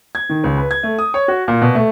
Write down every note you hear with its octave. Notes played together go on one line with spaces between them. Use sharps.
G#6
D#3
C#2
B4
G#6
A3
D#6
C#5
F#4
A#2
B2
A3